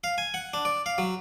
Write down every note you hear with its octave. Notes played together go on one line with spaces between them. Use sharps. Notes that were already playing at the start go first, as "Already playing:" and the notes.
F5
G#5
F#5
D4
D5
F5
F#3